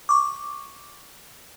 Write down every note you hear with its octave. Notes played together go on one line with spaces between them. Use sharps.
C#6 D6